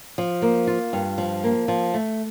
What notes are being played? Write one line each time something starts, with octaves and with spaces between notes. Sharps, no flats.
F3
A#3
F4
G2
F3
A#3
F3
A3